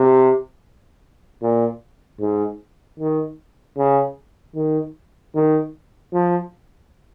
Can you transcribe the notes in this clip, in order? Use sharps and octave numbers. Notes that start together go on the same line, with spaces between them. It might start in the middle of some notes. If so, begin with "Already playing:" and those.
Already playing: C3
A#2
G#2
D#3
C#3
D#3
D#3
F3